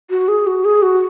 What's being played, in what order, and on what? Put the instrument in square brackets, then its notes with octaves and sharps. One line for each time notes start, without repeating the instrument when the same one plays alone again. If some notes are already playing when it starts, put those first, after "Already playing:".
[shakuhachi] F#4
G#4
F#4
G#4
F#4